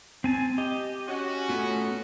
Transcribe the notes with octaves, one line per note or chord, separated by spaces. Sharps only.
C4 G#5 A5
G4 D#5
C#4 F#4
A3 B3 F4